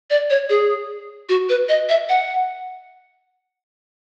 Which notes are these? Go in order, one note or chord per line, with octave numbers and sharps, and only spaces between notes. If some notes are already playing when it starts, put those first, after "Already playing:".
D5
C#5
G#4
F#4
B4
D#5
E5
F#5